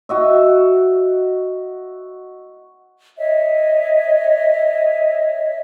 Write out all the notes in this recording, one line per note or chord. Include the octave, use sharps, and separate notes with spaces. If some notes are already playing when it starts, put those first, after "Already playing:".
F#4 D#5 E5
C#5 D#5 E5